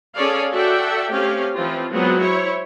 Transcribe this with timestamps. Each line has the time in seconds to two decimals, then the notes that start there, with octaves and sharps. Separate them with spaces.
0.15 C#4 G#4 A4 C#5 D5 F5
0.53 F#4 A4 D5 E5 G5
1.12 A3 C4 C#4 G4 F5
1.55 E3 F3 C4 F4
1.91 F#3 G#3 B3 C4 F4
2.20 E4 C5 C#5